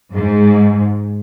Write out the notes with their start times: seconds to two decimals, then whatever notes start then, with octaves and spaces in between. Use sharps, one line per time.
0.13 G#2